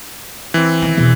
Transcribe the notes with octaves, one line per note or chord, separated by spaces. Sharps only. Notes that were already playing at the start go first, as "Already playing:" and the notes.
E3 C4
D#3 D#4
E2 B2